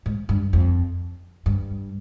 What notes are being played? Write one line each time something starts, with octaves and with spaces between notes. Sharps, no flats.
G#2
G2
F2
G2